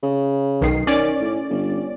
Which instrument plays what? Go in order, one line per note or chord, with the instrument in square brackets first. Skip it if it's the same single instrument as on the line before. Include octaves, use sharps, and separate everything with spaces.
[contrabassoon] C#3
[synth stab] B1 D#3 C7
[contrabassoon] D#3 [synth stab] C#4 D5
[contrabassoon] A2
G1